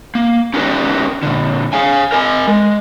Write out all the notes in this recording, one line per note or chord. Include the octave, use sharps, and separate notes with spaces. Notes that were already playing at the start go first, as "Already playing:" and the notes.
A#3
C#4 D#4 G4 A#4 B4
A#2 D3
G#4 F5 G#5
A#4 D#5 G#5
G#3